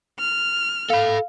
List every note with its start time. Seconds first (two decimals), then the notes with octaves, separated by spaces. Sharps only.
0.20 F6
0.90 A4 F5 B5